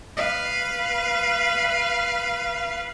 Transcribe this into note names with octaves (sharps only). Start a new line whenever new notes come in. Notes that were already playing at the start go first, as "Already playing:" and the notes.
B4 F5